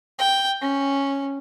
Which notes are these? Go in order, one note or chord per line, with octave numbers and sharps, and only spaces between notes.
G5
C#4